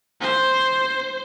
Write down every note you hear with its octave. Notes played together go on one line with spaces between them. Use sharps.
C5